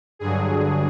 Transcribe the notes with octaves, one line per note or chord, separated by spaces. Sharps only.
G2 D3 F#3 G#4